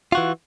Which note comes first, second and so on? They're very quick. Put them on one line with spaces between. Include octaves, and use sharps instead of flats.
F4 F#4 E3